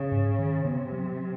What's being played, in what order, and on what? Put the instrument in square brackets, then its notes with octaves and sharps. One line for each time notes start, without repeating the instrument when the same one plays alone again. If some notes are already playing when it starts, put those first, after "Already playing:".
Already playing: [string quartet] C#3
[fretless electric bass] G#2
D#3
[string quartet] C3 [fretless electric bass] B3
[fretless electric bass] F#3